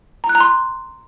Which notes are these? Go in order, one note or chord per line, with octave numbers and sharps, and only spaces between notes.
A#5
F#6
A#5
C6